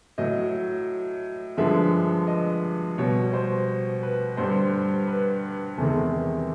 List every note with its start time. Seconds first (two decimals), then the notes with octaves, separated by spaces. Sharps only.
0.18 A2 F#3 D#5
1.57 G2 D3 F3 G#3 E5
2.27 D#5
2.98 B2 G3 C#5
3.33 C5
4.03 B4
4.37 G2 D3 G3 C5
5.08 B4
5.77 E2 C3 D#3 G#3 A4